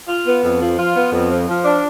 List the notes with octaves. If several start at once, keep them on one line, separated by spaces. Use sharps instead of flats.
F4
B3
F2
F3
F4
B3
F2
F3
F3
D4